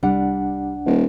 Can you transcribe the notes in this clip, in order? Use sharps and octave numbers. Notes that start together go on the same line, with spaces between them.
C2 G3 D4 F#5
D#1